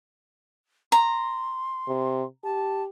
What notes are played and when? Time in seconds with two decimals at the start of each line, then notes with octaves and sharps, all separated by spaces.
0.92 A#5 C6
1.88 C3
2.44 G4 A5